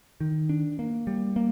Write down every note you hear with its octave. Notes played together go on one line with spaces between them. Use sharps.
D#3
D4
A#3
G3
A#3